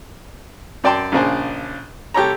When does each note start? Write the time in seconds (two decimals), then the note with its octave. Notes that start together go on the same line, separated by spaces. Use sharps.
0.84 F#2 D5 G5 A5 C6
1.12 A#1 C#3 D4 C5 G#5
2.14 C2 G4 A4 C#5 A#5